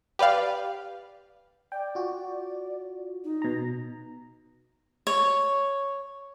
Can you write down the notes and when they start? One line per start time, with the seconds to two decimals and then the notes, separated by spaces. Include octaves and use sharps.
0.19 G4 B4 D5 F5
1.72 D5 G5
1.95 F4 F#4
3.24 D#4
3.42 B2 A#5
5.07 C#5